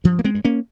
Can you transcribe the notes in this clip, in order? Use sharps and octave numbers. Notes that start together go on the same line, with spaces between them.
G2 F3
A#3
G#3 C4
G2
A#3 C#4